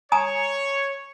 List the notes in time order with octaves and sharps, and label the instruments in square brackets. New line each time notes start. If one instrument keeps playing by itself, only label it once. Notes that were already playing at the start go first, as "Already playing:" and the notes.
[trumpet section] C#5 [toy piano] G#5 A#5 D#6